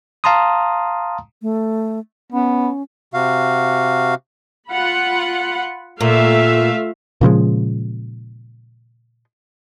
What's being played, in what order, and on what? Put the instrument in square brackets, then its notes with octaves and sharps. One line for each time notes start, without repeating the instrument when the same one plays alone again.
[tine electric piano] F5 A5 A#5 C6 D#6
[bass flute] A3
[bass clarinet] B3 [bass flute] C#4
[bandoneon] C3 F#4 F5
[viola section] F4 F#5 B5
[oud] A#2 [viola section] A3 E5 F5
[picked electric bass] A#2 C#3 F3 G#3